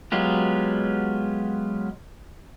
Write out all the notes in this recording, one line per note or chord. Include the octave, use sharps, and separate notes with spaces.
F#3 G#3 B3 F4 G4